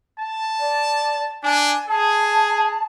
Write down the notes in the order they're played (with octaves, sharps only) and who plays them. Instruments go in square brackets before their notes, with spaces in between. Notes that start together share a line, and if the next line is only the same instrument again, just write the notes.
[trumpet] A5
[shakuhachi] D5
[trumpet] D4 [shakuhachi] G#5
[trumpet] G#4 [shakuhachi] A5